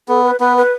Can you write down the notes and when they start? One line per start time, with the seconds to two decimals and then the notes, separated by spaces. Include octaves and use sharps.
0.08 B3 A4
0.24 B4
0.40 B3 B4
0.57 B4